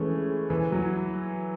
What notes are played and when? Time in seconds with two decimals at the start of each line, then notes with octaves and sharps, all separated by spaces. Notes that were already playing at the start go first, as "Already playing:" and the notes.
Already playing: E3 G#3 A3 C#4
0.50 E3
0.72 F#3